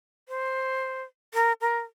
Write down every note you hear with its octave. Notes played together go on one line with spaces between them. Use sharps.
C5
A#4
A#4